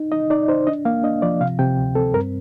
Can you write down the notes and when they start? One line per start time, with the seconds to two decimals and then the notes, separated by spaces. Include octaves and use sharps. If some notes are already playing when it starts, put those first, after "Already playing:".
Already playing: D#4
0.12 D#4 D#5
0.30 D#4 D5
0.48 D#4 C5
0.67 D4 D#5
0.85 A#3 F5
1.03 D4 D#5
1.22 F3 D5
1.41 C3 F5
1.59 C3 G5
1.78 D2
1.95 C4 A4
2.14 G2 A#4